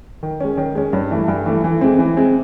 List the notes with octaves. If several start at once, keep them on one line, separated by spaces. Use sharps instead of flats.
D#3
G#3 C#4
D#3
G#3 C#4
G2
E3 A3
G2
E3 A3
E3
G#3 C4
E3
G#3 C4